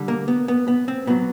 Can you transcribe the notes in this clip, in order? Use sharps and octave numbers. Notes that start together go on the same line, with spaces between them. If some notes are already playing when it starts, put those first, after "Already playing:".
Already playing: D3 G3
A#3
B3
B3
B3
C4
A#2 F#3 B3